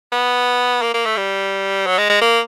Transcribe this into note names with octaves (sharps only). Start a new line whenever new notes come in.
B3
A#3
A#3
A3
G3
F#3
G#3
G#3
A#3